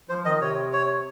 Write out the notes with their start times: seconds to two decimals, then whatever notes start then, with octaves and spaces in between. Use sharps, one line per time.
0.09 F3 C5
0.25 D#3 D#5
0.41 C3 C#5
0.73 C#5